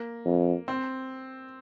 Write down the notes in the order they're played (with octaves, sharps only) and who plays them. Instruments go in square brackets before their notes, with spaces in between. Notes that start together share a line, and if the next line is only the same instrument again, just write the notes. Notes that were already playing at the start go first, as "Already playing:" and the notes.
Already playing: [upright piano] A#3
[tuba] F2
[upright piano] C4